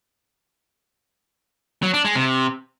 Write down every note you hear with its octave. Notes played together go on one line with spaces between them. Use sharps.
F#3
D4
G#3
C3